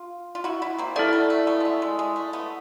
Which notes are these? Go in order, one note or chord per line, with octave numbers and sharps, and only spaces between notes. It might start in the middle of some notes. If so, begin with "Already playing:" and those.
Already playing: F4
F4
E4 F#4
E4 F#4
A#3 C4
A3 B3 E4 A4 D5
A3
A3
A3 B3
G#3
A3
G#3
G#3
A3
A3 B3